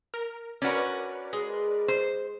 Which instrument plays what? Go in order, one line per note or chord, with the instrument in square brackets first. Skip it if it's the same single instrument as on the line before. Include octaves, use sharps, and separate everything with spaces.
[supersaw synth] A#4
[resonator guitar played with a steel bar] C#4 F#4 [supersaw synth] A#4 B4 D5
[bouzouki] G#3
[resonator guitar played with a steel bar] C5